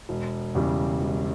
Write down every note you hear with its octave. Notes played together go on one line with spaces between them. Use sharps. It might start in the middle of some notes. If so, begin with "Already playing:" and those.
E1
E2 C#3 G3
E1